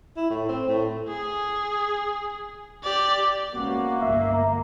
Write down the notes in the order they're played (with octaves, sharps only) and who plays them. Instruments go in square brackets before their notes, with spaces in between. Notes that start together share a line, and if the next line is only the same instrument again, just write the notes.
[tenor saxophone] E4
A2
C4
A2
[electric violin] G#4
G4 D5
[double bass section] G#3 B3 C#4 [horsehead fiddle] A#3 [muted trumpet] F#4
[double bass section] G1 C#2 G2 [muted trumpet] E5
[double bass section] D2 [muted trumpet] A#5